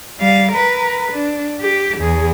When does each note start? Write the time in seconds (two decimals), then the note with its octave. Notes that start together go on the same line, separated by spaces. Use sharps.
0.20 G3 F5
0.52 A#4 B4
1.12 D4
1.61 G4
1.98 E2 G#4